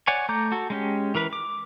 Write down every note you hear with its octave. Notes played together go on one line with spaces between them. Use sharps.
C#5 D5 F#5 G#5 C#6
A3 A#5 D6 G6
F#4 A4
G#3 C#4 G4
E3 A#4 B4
D6